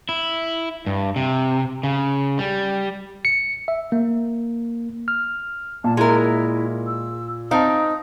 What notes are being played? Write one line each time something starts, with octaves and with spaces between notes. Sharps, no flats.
E4
G2
C3
C#3
G3
C#7
E5
A#3
F6
A#2 A5
G#3 E4 A#4
E6
C4 D#4 F5 A5 D#6